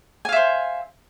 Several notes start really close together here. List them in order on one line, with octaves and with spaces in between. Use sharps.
G#5 F5 E5 C5